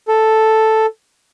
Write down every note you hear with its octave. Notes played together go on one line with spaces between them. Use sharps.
A4